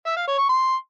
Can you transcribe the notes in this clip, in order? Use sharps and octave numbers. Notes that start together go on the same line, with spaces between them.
E5
F5
C#5
C#6
C6